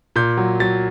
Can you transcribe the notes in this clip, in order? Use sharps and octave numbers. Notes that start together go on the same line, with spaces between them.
A#2 G6
F#3
F#3 A6